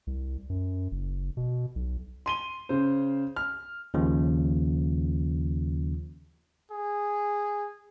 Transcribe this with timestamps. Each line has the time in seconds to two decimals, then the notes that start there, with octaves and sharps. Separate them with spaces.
0.07 C2
0.50 F#2
0.91 F#1
1.37 B2
1.76 B1
2.26 C6 D#7 G7
2.69 C#3 C5
3.36 F6
3.94 D#2 C#3 F3
6.71 G#4